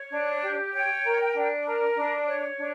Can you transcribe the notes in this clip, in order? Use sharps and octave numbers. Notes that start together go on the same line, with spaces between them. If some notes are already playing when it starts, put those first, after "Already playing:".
Already playing: C#5
D4
G4
C#5 G5
A#4
D4
A#4
D4
C#5
D4